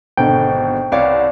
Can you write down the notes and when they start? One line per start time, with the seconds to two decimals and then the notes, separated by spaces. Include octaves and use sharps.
0.17 G#1 B2 D3 G5
0.92 C2 C#5 D5 F5